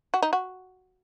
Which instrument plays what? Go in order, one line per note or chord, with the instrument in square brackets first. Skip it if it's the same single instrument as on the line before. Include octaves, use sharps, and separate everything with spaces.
[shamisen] F#4
D#4
F#4